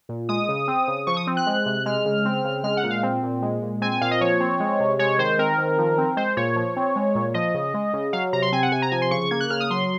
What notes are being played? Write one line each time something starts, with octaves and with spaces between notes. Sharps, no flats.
A#2
G#3 D#6
C#3
C4
C#3
F3 C#6
D#6
C4
F#6
G#3
C3
G#3 F6
C#3
C4
C#3
G#3 F6
F#5
A#2
F5
C4
A#2
G#3
A#2
C4 G#5
G#5
A#2 F5
D#5
F3 C#5
C4
G#3
C3
G#3 C#5
D#3 C5
C4 A#4
D#3
F3
C4
G#3 C5
A#2 C#5
F3
C4
G#3
A#2
F3 D#5
C#3
G#3
C#3
F#3 F5
C3 A#5
C6
C4 G#5
F#5
C3 G#5
A#5
F3 G#5
C6
C#3 C#6
C#6
A#3 G#6
F#6
C#3 F6
D#6
F#3 C6